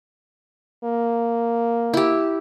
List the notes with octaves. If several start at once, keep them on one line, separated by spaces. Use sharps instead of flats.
A#3
E4 G4